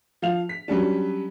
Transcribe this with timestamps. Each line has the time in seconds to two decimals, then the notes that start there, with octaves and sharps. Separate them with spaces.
0.22 F3 F5 F7
0.49 B6
0.68 F#3 G3 C#4 D4